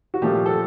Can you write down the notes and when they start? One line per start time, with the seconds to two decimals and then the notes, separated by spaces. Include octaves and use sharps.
0.14 F#4
0.22 A#2 F3 A3 G4
0.46 A4